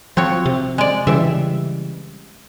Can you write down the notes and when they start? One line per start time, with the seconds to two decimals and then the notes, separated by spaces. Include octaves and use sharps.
0.17 F3 C4 F#4 C#5
0.46 C3
0.78 G#3 D5
1.07 C#3 E3 G3 E5